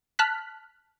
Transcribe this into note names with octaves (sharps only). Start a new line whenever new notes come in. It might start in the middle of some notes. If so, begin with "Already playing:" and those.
A5 F6 F#6 B6